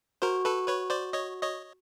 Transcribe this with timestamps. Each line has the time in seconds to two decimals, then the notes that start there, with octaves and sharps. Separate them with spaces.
0.22 F#4 A#4 C5
0.45 A4 B4
0.68 B4 C#5
0.90 C5 D5
1.13 C#5 D#5
1.43 C#5 D#5